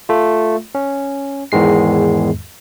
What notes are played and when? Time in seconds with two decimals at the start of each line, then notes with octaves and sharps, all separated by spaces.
0.09 A3 F4
0.75 C#4
1.52 E2 G#2 D#3 G#3 C7